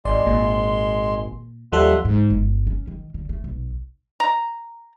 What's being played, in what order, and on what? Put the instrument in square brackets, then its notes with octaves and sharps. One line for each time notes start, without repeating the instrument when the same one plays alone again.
[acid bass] G#1 [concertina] G#3 C6 [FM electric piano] D5
[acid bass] G#1 [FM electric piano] A#2
[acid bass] D#2 [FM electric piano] F3 G3 A4 [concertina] E5 F#5 C6
[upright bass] G#2
G1
C#4
D#3
D3
A3
B1
[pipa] A#5